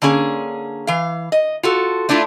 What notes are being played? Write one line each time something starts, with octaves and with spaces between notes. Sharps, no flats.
D3 A#3 C#4 G#4
E3 F5
D#5
F4 F#4 A4
A3 D4 E4 F4